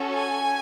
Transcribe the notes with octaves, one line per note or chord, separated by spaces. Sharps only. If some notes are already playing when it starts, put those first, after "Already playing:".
Already playing: C#4 F#4 A4
G#5